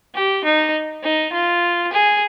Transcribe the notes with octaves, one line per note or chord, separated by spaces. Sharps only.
G4
D#4
D#4
F4
G#4